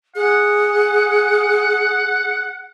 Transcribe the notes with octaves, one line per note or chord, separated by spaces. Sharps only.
G#4 F#5